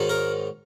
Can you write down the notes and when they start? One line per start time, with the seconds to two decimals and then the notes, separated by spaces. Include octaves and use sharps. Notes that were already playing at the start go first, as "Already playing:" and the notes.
Already playing: G#2 D#3 F#3
0.09 A#4